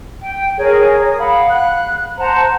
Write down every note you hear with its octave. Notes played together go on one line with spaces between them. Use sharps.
G5
G#4 A#4 C#5
D#6
F5 F#5 B5
F#6
C5 F#5 A5 A#5